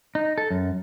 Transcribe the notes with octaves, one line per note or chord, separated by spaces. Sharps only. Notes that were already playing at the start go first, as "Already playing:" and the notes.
D#4
A4
F#2